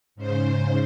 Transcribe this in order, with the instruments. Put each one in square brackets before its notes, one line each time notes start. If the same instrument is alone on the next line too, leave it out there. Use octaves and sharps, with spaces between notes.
[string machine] G#2 C#3 C5